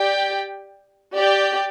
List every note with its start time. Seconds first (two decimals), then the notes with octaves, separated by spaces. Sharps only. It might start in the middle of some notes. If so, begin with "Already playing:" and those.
Already playing: G4 D5 G5
1.14 G4 D5 G5